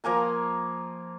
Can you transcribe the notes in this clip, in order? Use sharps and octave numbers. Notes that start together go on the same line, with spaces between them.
F3 A#3 G#5 A#5